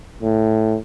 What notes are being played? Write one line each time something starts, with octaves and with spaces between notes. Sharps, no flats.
A2